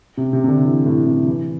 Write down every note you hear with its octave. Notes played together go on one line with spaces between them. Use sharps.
C3
C3
C3
D3
E3
A2
C3
E3